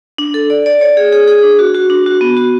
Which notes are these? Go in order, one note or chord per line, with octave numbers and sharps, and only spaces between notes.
D4
A4
D5
D5
C#5
G#4
G#4
G#4
D4
F#4
F#4
D4
F#4
B3
F#4